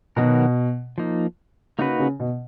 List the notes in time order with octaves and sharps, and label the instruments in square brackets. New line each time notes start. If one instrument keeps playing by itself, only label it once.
[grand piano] B2 [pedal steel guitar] D#3 F#3 B3 F#4 A#4
[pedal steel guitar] F3 A#3 D#4
[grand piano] C#3 [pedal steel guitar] A#3 D#4 F#4 B4
[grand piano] C#3
B2